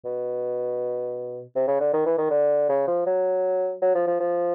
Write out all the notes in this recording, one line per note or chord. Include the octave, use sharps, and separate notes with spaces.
B2
C3
C#3
D3
D#3
E3
D#3
D3
C#3
F3
F#3
F#3
F3
F3
F3